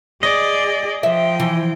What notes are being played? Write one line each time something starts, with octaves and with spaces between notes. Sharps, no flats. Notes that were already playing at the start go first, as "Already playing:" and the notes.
G#4 D5 D#5
F3 E5 G5
E3